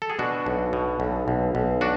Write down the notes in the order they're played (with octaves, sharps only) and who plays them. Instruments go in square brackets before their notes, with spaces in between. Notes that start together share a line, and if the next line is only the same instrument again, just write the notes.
[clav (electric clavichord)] A4
G#4
B2 D4 F#4
B1
B2
B1
B1
B1
D4 F#4